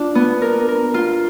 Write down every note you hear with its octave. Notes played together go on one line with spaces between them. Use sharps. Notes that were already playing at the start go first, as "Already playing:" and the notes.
Already playing: D4 F4
B3
A#4
A#4
F4